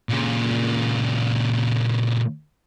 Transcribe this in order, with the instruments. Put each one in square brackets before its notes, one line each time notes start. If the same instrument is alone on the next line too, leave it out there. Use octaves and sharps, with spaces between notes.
[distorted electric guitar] A#2 C#3